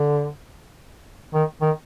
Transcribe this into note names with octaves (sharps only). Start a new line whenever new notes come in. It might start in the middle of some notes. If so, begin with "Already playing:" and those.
Already playing: D3
D#3
D#3